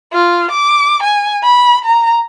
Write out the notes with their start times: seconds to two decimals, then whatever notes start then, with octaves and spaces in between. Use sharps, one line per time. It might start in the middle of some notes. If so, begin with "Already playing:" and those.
0.13 F4
0.51 D6
1.03 G#5
1.43 B5
1.85 A#5